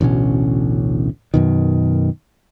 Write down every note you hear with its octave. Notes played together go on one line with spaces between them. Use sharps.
A1 D2 B2 C#4
F#2 B2 D#3